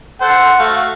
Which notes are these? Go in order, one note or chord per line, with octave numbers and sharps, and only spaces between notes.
A4 C5 F#5
A3 F#4 F5